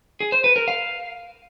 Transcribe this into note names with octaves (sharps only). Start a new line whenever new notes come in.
G#4
C5
B4
A#4
F5